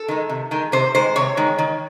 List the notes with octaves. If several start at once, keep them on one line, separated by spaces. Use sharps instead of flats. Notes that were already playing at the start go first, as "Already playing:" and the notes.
Already playing: A4
D#3 G#3
C3
D#3 G#3
C3 C5
D#3 G#3 C5
C3 C#5
D#3 G#3
D#3